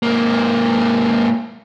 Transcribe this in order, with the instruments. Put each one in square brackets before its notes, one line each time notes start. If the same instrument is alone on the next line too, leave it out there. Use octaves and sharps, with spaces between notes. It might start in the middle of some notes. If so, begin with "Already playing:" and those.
[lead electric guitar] G#2 A#3